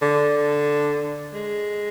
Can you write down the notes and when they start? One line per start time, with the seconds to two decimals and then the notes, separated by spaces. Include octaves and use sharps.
0.02 D3
1.34 G#3